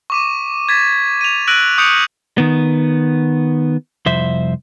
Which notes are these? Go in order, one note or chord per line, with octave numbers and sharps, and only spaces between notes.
C#6 D6 D#7
G#6 A6 B6
D#7 F7
E6 F#6 A#6 D7 D#7 F#7
C#6 D#6 G6 C#7 D7 F7
D#3 B3
C2 F2 C5 E5